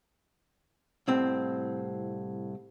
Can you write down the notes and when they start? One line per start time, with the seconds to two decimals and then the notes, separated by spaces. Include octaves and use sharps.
1.08 C2 A2 C4